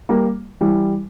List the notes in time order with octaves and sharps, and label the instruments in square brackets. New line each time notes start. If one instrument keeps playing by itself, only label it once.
[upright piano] G3 A#3
E3 G3